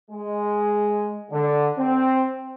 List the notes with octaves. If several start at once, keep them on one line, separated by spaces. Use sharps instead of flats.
G#3
D3
C4